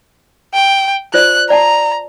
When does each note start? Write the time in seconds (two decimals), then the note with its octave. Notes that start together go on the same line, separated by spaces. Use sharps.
0.54 G5
1.14 F4 C5 D5 F#6
1.50 D5 F#5 A5 A#5